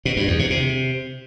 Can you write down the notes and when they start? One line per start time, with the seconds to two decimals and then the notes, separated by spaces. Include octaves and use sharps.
0.05 B2
0.17 G2
0.28 E2
0.39 C3
0.50 C3